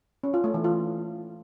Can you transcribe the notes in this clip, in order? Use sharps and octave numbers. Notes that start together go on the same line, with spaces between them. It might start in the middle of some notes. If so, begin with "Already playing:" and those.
C#4
F4
A3
E3
F4